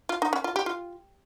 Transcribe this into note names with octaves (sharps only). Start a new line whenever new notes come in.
F4
D#4
C#4
F4
G4
F4